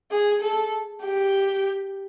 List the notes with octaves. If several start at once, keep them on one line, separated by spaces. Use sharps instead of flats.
G#4
A4
G4